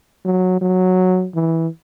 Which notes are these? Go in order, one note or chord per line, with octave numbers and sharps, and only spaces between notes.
F#3
F#3
E3